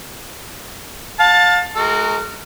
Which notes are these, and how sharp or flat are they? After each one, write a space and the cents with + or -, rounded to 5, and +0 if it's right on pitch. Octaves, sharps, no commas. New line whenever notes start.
F5 +30 A5 +10
G#3 +30 F#4 +0 A#4 -25